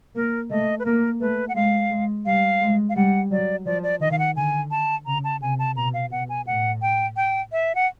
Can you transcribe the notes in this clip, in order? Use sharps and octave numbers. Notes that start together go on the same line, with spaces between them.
A#3 A#4
A3 D#5
B4
A#3 A#4
A3 B4
F#5
G#3 F5
G#3
G3 F5
G#3
F5
G3 F#5
F#3 D5
F3 D5
D5
D#3 D#5
F5
F#5
D3 G#5
A5
C#3 A#5
A5
C3 G#5
A5
B2 A#5
F5
B2 F#5
G#5
A2 F#5
G5
G5
E5
F#5